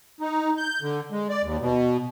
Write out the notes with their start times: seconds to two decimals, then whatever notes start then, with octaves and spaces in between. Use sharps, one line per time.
0.20 D#4
0.58 G6
0.81 D3
1.11 G#3
1.29 D5
1.43 D#2
1.60 B2